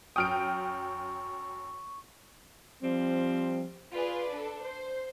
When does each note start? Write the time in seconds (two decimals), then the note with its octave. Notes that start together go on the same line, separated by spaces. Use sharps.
0.16 F#2 G5 C#6 D#6 F6 D7
2.82 F3 G3 C4
3.92 F4 G#4 B4 D5
4.30 D4 A4
4.60 C5